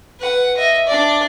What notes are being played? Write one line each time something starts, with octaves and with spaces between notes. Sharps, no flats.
B4 F#5
D#5 E5
D4 D5